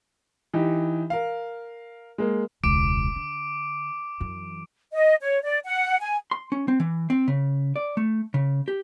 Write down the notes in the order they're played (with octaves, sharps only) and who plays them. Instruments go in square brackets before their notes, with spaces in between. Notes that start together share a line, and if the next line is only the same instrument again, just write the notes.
[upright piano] E3 D#4 G4
A#4 F5
G#3 A#3
[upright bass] E1 C#2 [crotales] D6 D7
[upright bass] D3
F#2 E3
[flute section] D#5
C#5
D5
F#5
G#5
[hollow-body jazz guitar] C6
C#4
C4
E3
C4
C#3
D5
A3
C#3
G4